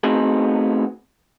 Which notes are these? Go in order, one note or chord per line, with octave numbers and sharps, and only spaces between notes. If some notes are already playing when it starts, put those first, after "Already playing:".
A3 B3 C4 D#4 F#4 G#4